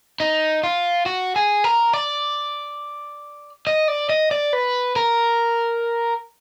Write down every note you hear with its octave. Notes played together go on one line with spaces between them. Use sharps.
D#4
F4
F#4
G#4
A#4
D5
D#5
D5
D#5
D5
B4
A#4